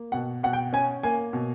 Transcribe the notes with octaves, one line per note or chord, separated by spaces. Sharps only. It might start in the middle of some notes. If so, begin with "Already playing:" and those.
Already playing: A#3
B2 F#5
B2 F#5
G5
C#4 G#5
A#3 G#5
B2